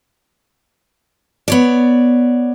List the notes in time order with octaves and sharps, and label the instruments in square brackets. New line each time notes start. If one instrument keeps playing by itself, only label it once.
[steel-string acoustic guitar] B3 C#5 D5